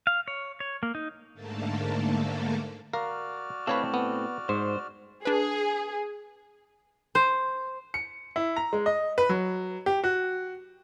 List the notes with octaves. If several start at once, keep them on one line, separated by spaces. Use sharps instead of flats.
F5
C#5
C#5
A#3
D#4
G#2 D3 A3 A#3 A4
F#4 A#4 D5 F5 F6
A2 C4 A4 B4 C#5 F5
B3
G#2 C5
D4 G#4 B4
C5
C#7
E4
A#5
G#3
D#5
B4
F#3
G4
F#4